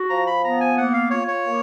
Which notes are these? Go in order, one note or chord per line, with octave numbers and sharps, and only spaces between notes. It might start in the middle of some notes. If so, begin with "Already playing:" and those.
Already playing: F#4
F3 A#5
B5
B3 A#5
G#5
A#3 F#5
F5
F4 C#5
C#5
A#3